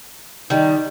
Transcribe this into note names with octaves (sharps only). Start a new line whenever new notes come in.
D#3 G3 D#4